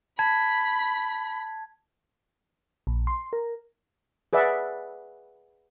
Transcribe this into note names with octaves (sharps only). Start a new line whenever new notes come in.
A5 B5 G#6
A#1
C6
A#4
G#4 B4 D5 E5 F#5